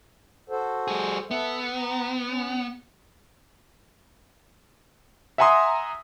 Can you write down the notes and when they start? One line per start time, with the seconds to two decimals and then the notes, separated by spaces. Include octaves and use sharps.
0.49 F#4 A4 C5
0.88 G3 G#4
1.31 B3 A4 E5
1.77 A#5
2.27 C#4
5.38 E5 F#5 G#5 A#5 C6 D#6